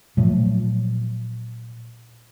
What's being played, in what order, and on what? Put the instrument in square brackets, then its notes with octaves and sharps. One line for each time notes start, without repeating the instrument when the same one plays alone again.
[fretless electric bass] A#2 F3 F#3 A3